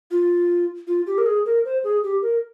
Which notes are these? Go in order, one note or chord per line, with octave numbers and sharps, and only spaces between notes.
F4
F4
G4
A#4
G#4
A#4
C5
G#4
G4
A#4